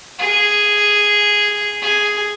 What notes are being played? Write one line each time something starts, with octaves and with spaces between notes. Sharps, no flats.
G#4
G#4